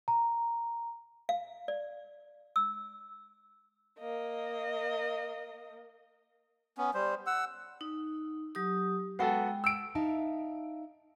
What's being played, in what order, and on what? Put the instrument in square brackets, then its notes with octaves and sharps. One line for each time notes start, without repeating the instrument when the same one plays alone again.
[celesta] A#5
[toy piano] F5
D5
E6
[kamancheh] A#3 D#5
[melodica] B3 C#4
G3 C5
F#5 E6
[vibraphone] D#4
F#3 G4 D#6
[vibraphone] G#3 G5 [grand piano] B3 F#4 A4
[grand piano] E6 D7
[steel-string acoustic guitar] D#4 E5 F5 A5